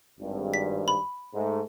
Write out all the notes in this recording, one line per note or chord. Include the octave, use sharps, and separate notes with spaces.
G#1 G2
B6
B5
G#2 A3